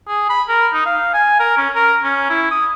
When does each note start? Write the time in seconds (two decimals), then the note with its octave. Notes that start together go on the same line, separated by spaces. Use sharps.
0.07 G#4
0.29 B5
0.48 A#4
0.73 D#4
0.86 F5
1.14 G#5
1.39 A#4
1.58 C#4
1.75 A#4
2.04 C#4
2.30 E4
2.51 D#6